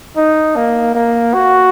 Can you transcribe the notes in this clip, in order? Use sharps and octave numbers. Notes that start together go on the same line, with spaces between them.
D#4
A#3
A#3
F#4